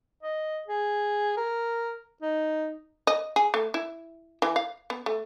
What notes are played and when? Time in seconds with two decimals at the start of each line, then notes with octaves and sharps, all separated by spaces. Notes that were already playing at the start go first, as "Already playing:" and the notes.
0.23 D#5
0.68 G#4
1.37 A#4
2.22 D#4
3.07 D#5
3.36 G#4
3.54 A3
3.74 E4
4.42 E3
4.56 F5
4.90 B3
5.06 A3